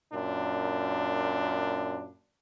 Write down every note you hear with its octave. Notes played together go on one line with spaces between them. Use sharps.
F#2 A#2 D4